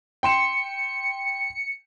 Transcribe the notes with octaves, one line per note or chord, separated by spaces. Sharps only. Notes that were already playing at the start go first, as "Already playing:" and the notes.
G5 C6 C#7 E7